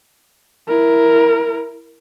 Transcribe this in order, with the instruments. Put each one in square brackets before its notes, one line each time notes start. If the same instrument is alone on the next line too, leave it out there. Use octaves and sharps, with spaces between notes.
[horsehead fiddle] E4 A#4